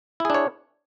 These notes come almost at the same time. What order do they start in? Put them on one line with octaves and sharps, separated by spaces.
E4 G#4 D4 C#5